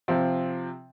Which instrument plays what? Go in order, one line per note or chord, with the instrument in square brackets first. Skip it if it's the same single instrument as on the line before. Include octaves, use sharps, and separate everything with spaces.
[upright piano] C3 F3 C4